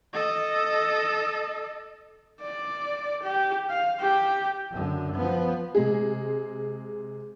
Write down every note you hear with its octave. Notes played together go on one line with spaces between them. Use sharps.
A4 D#5
D5
G4
F5
G4
F#2 D3
F3 B3
C3 G#3 G#4